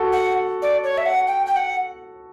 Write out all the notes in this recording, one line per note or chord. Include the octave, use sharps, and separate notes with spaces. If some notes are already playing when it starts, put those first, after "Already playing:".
Already playing: F#4 A4
F#5
D5
C#5
E5
F#5
G5
G5
F#5